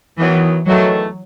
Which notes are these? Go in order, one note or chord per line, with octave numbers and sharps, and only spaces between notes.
D#3 E3 F#3 B3
E2 D#3 F#3 A3